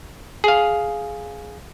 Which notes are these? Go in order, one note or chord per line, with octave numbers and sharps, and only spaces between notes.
G#4 F5